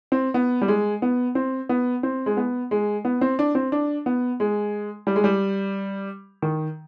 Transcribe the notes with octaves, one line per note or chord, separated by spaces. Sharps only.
C4
B3
G3
G#3
B3
C4
B3
C4
G#3
B3
G#3
B3
C4
D4
C4
D4
B3
G#3
G3
G#3
G3
D#3